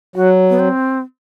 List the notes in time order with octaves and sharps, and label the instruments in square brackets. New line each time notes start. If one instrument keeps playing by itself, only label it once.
[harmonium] F#3 [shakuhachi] F#4
[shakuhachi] B3
C4